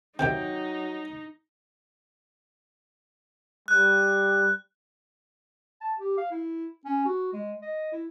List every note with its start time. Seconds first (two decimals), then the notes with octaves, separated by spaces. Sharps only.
0.19 C3 D#3 F#3 D#4 E5 G5
3.68 G3 F#6
5.81 A5
5.98 G4
6.18 F5
6.31 E4
6.85 C#4
7.05 F#4
7.33 G#3
7.62 D#5
7.92 E4